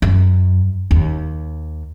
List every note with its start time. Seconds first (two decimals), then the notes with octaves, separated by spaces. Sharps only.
0.02 F#2
0.91 D#2